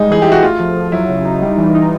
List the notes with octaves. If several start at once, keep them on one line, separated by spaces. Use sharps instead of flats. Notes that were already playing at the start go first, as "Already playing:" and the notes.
Already playing: G3 G#3 D#4
E3 G#4
E4 G4
F#4
A3 F4
F3
F3
F#3 E4
C#3
D#4
G3
E3
D#4